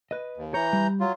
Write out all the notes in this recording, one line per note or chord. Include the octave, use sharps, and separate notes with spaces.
B4 D#5
D#2
E3 C#5 A#5 G6
G3
F#3 F4